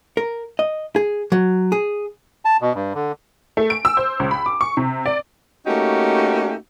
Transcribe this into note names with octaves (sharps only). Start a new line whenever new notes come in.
A#4
D#5
G#4
F#3
G#4
A5
B2
G2
D3
A3
D7
E6
C5
C#2
B5
D6
C#6
C3
D5
A3 A#3 C#4 D#4 F#4 G4